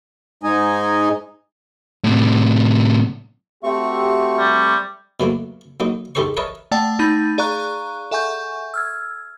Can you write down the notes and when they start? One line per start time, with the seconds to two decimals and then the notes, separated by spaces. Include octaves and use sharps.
0.43 G#2 G#3 D#4 D#5 G#5
2.04 A2 C3
3.63 A3 C4 F#4 G4 E5 C#6
4.38 G3
5.20 B2 F#3 A3 A#3
5.80 F#3 A#3 D#4
6.15 G#2 D#3 G4 A4 C5 C#6
6.37 A#4 B4 C#5 D#5 E5 A5
6.71 A3 D5 F#5 G5 A5
6.99 A3 D#4 B5 G6 A6
7.38 G#4 D5 F5 A#5 C#6 F#6
8.11 A4 E5 F#5 G#5 C#6 G6
8.74 E6 F6 G#6